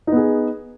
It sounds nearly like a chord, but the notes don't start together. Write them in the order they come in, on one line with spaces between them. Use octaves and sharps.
D#4 B3 G#4